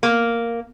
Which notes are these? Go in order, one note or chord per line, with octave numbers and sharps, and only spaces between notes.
A#3